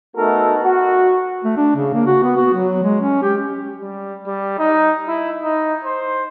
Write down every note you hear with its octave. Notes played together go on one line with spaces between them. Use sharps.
A3 B3 D#4 F#4 A4 A#4
F#4
A3
D4
C#3
A#3
F#4
B3
F#4
F#3
G#3
C#4
G4
G3
G3
D#4
E4
D#4
C5